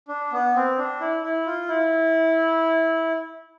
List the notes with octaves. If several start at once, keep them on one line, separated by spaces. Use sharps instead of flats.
D4
B3
C4
D4
E4
E4
F4
E4